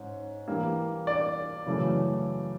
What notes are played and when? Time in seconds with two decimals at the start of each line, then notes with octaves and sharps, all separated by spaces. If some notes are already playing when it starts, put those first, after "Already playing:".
Already playing: G#2 C#4
0.48 E3 G3 A#3
1.07 D5
1.66 F#2 C#3 E3 A3